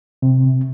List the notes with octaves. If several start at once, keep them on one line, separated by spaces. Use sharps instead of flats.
C3